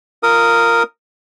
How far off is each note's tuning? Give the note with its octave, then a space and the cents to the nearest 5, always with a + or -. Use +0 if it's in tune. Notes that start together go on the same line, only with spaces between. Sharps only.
F4 +0 A#4 -5 D#6 +0